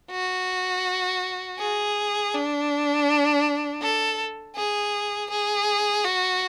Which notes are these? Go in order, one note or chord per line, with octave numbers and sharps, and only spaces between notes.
F#4
G#4
D4
A4
G#4
G#4
F#4